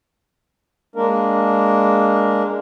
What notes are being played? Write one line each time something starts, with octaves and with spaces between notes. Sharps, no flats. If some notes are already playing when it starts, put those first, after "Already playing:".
G#3 A#3 D4 A#4